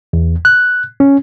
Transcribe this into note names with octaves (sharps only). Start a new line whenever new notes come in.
E2
F#6
C#4